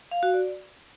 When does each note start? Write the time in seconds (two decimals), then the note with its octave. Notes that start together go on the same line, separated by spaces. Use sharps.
0.11 F5
0.23 F#4
0.34 D5